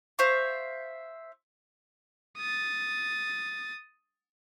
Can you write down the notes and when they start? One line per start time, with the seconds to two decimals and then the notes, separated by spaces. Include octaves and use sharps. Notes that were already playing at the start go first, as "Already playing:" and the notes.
0.19 C5 E5 F5 C#6
2.37 D#6 A6